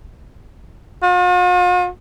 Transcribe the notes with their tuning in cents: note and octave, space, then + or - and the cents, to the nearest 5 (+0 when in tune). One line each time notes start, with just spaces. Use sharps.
F4 +45